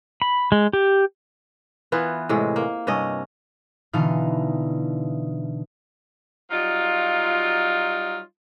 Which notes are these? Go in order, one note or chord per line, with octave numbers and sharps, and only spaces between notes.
B5
G#3
G4
E3 B3 F4
A2 C3 G#3
A#3
G2 C3 C#4 D#5
B2 D3 E3 D#4 F5 F6
F#3 G3 D#4 F4